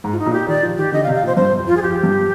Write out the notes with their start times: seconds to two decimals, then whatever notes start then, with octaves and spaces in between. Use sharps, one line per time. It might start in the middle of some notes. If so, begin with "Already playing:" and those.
0.04 G#2
0.13 F4
0.19 D#4
0.26 A#2
0.33 G4
0.48 D#3 D5
0.63 F3
0.78 D#3 G4
0.92 D3 D#5
1.03 F5
1.07 C3
1.15 F5
1.23 A#2
1.27 C5
1.37 G2 C5
1.59 F2
1.67 F4
1.77 G#4
1.81 F2 G4
2.03 G2